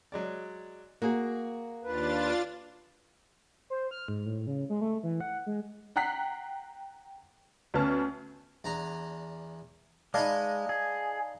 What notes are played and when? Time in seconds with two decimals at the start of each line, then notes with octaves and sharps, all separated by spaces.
0.12 F#3 G#3 D5
1.02 A#3 F#4 G#4
1.84 D#2 D4 F4 B4 A6
3.70 C5
3.91 F6
4.08 G#2
4.26 A2
4.47 C#3
4.70 G#3
4.81 A3
5.03 E3
5.21 F#5
5.46 G#3
5.96 F#5 G5 A#5 F#6 B6 C7
7.74 D2 B3 C#4 B4 A5 F6
8.64 E2 D4 A#5
10.14 G#3 D#4 B4 D5 D#5 F5 A5
10.69 G#4